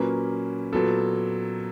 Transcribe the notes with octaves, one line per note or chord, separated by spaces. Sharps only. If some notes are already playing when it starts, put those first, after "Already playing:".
Already playing: A#2 F#3 A#3 C#4 B4
A#2 F#3 B3 A4